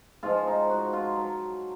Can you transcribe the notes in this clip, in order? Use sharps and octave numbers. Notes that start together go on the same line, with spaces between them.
G#2 F3 F4
D#4
F#4
F4
F#3